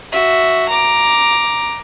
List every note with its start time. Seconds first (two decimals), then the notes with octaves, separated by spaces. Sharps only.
0.12 F#4 E5
0.69 A#5 D6